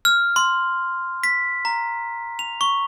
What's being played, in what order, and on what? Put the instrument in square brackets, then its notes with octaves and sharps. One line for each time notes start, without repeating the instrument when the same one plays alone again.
[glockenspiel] F6
C6
B6
A#5
F7
C#6